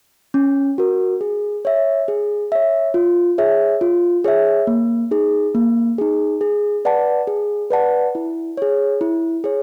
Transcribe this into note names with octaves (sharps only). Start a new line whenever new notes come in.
C#4
F#4 A#4
G#4
C#5 E5
G#4
C#5 E5
F4
G#4 C#5 E5
F4
G#4 C#5 E5
A#3
D#4 G#4
A#3
D#4 G#4
G#4
B4 D5 F#5 A5
G#4
B4 D5 F#5 A5
E4
G#4 C#5
E4
G#4 C#5